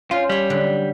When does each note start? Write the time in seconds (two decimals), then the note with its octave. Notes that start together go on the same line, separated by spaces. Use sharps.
0.11 C#4 F4 C5 F5
0.29 G3 G4 C#5
0.50 D3 F#3